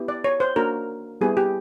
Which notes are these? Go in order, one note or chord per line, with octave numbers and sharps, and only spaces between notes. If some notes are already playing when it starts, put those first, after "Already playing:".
Already playing: B3 E4 G4
D5
C#5
C5
A#3 D4 F#4 A#4
G3 B3 E4 G4 G#4
G4